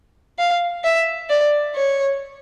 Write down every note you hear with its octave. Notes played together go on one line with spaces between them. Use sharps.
F5
E5
D5
C#5